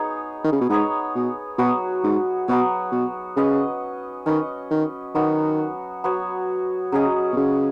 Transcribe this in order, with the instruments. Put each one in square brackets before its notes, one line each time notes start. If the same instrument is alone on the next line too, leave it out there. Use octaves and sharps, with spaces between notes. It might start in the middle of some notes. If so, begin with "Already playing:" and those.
Already playing: [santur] B3 D#4 G#4 C#5
[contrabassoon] D#3
C#3
B2
[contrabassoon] G#2 [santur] B3 D#4 G#4 C#5
[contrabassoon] B2
[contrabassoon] B2 [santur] F#3 B3 F#4 C#5
[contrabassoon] G#2
[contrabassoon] B2 [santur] F#3 B3 F#4 C#5
[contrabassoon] B2
[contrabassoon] C#3 [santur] C#4 B4 D#5
[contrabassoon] D#3 [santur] C#4 B4 D#5
[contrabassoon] D#3
[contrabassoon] D#3 [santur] F#3 B3 F#4 C#5
[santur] F#3 B3 F#4 C#5
[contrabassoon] C#3 [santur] F#3 C#4 G#4 D#5
[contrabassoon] B2
C#3